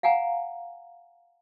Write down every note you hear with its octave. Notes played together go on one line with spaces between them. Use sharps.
F5 F#5 G#5 A#5